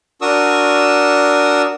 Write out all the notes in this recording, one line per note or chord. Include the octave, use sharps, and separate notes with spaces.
D4 F#4 A#4 C#6 D#6 E6